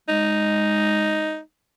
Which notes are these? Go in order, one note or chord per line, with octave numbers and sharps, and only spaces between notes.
G#3 D#4